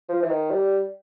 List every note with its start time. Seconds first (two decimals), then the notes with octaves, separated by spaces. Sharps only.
0.09 F3
0.22 E3
0.29 D#3
0.50 G3